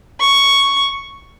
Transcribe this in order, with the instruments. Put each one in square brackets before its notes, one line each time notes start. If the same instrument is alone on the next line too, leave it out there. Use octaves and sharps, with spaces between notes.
[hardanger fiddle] C#6